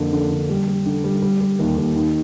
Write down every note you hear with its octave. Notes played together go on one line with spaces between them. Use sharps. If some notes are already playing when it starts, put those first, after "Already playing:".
Already playing: F2 D3 A#3
D3
D3
G3
G3
D3
G3
G3
G3
D#2
D#2
D#4